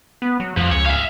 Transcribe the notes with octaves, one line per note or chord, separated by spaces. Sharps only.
B3
F#3
F2 F3
C#2 C#5
E5 F5